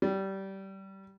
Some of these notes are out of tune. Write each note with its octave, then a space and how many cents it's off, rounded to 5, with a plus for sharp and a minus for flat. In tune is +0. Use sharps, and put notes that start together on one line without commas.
G3 -20